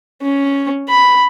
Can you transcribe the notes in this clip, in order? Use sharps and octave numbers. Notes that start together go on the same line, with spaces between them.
C#4
B5